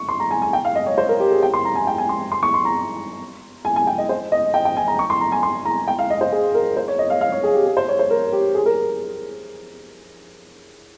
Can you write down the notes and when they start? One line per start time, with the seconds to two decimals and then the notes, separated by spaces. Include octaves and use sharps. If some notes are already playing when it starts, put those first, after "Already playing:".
Already playing: C#6
0.09 C6
0.20 A#5
0.31 G#5
0.42 G#5
0.53 G5
0.65 F5
0.75 D#5
0.86 C#5
0.98 C5
1.09 A#4
1.20 G4
1.31 G#4
1.43 G5
1.54 C6
1.65 A#5
1.75 G#5
1.87 G5
1.98 G#5
2.09 C6
2.32 C6
2.43 C#6
2.54 C6
2.65 A#5
3.65 G#5
3.76 G#5
3.87 G5
3.98 D#5
4.09 C5
4.32 D#5
4.54 G5
4.65 G5
4.77 G#5
4.88 A#5
4.99 C#6
5.10 C6
5.21 A#5
5.32 G#5
5.43 C6
5.65 A#5
5.88 G5
5.99 F5
6.10 D#5
6.21 C5
6.32 G#4
6.55 A#4
6.77 C5
6.88 C#5
6.99 D#5
7.10 F5
7.21 F5
7.32 C#5
7.44 G#4
7.55 G4
7.66 G#4
7.77 C5
7.89 C#5
7.99 C5
8.10 A#4
8.32 G4
8.55 G#4
8.66 A#4